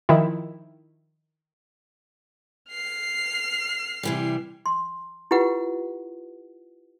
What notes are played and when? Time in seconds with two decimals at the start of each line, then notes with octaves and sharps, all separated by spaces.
0.09 D#3 F3 E4
2.70 F6 C7
4.03 C3 E3 G3
4.66 C6
5.31 E4 F4 G4 B4 F#5